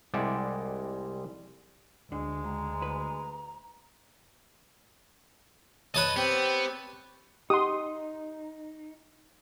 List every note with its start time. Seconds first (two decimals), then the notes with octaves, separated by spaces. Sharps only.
0.14 C2 G3 G#3 D5 E5 F#5
2.12 D2 D3 G#3
2.44 C#2 A#5
2.82 B4
5.95 B4 C#5 D#5 A5
6.17 B3 C4 G4
7.50 D#4 G4 F#5 C6 D#6